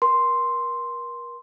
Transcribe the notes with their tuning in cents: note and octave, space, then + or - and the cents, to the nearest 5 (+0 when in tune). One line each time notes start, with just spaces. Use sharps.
A#4 +35 C6 +0